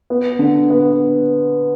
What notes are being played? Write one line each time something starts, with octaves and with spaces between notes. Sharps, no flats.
B3
D3
B3